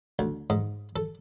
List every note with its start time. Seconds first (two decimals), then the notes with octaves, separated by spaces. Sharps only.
0.19 D2
0.50 G#2
0.96 A4